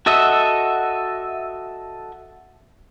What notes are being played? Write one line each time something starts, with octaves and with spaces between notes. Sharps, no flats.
F#4 A4 D#5 E5